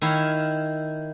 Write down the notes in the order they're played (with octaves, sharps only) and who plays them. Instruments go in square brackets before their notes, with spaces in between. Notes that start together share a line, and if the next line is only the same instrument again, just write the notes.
[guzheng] D#3 E4 C#5 F5